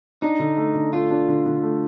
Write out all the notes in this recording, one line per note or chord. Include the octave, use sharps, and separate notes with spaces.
D4 D#4
D3
A3
D3
A3 F4
D4
D3
D3
A3